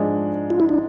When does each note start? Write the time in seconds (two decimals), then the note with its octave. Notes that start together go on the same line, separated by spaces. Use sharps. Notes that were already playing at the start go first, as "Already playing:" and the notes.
Already playing: G#2 F3 G#3 D4
0.50 F4
0.60 E4
0.69 D4